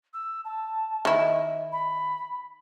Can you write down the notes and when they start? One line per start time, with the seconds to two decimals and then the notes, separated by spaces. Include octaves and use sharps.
0.13 E6
0.45 A5
1.05 D#3 E4 D#5
1.72 B5